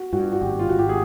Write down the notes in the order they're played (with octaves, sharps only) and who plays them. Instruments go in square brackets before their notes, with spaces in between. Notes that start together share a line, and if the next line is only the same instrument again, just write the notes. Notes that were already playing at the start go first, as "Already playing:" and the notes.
Already playing: [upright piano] F#4
[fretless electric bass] G2 [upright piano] F#4
[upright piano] F#4
[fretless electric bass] G#1 [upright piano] G4
[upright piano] F4
[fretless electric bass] G#1 [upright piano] F#4
[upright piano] G4
G#4